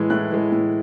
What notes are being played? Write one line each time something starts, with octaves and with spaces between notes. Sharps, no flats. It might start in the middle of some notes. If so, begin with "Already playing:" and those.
Already playing: A2 E3 G#3
A2 F#6
E3 G#3
A2